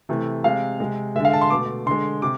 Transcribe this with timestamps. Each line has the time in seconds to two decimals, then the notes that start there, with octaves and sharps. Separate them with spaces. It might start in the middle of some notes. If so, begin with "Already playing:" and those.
0.09 C3 E3 A3
0.44 C3 G#3 F5
0.80 C3 G#3
1.16 D3 G#3 E5
1.25 F5
1.33 A5
1.41 C6
1.50 B2 A3 D6
1.86 D3 G#3 C6
2.22 C3 D6